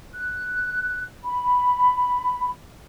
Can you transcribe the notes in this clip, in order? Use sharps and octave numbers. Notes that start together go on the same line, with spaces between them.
F#6
B5